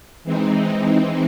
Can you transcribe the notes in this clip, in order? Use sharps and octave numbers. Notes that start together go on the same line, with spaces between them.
E3 G#3 C4 D#4